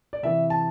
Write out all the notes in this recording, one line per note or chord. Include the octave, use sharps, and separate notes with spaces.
D5
C3 E3 E5
A5